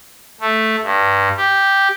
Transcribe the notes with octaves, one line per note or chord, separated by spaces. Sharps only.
A3
G2
G4